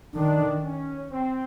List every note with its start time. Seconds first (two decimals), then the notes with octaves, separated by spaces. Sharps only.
0.14 D#3 D4
0.63 C#4
1.11 C4